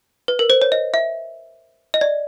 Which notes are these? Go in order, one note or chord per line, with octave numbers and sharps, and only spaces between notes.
B4
A#4
C5
C#5
D#5
E5
D#5
D5